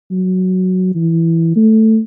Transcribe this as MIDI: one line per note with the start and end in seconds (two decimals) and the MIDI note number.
0.11 0.95 54
0.95 1.54 52
1.56 1.99 57